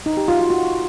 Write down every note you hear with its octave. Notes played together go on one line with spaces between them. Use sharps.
D#4
G4
F4
F#4
F#4